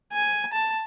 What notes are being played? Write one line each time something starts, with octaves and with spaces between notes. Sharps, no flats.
G#5
A5